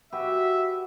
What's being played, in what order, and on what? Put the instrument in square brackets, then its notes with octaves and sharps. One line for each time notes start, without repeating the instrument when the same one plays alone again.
[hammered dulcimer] F#4 G4 B4 [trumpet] E5